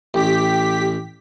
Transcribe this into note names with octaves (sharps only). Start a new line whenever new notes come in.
A1 G4 B6